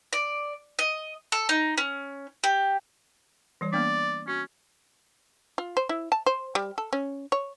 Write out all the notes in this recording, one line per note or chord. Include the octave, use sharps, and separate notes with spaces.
D5
D#5
A4
D#4
C#4
G4
E3 G3 C#5
A#3 B3 D4 D5
C#4 F#4
F4
C5
E4
A5
C5
G3
A4
C#4
C#5